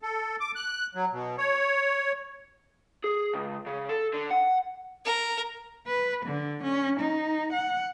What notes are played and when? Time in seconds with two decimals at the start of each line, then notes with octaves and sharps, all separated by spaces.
0.02 A4
0.40 D6
0.55 F#6
0.95 F#3
1.12 B2
1.38 C#5
3.04 G#4
3.34 C#2
3.66 C#3
3.89 A4
4.14 D3
4.31 F#5
5.05 A#4
5.87 B4
6.25 D3
6.63 C#4
7.00 D#4
7.52 F#5